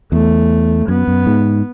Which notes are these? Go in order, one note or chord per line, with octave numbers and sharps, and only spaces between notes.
E2 A3
F#2 B3
F#2
G#2